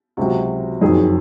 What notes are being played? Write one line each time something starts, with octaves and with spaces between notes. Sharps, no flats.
C#2 C3 F#3 F#4
F#1 F2 D#3 F#3 G#4